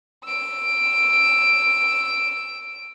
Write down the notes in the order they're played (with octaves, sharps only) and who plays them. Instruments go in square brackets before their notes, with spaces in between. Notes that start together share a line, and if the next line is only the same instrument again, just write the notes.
[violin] E6 D7